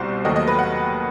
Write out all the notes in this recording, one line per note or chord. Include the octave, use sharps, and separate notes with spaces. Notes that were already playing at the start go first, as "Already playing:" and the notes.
Already playing: C2 B2 G3 C5
D#2 D#3 F#3 A3 D#5
D#5
B4
F#5